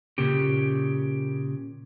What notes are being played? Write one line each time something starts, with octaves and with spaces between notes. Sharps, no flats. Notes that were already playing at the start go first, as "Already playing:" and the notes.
A#2 C#3 G4